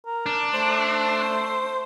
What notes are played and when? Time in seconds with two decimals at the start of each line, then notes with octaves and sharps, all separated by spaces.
0.06 A#4
0.26 D4
0.54 A3 C5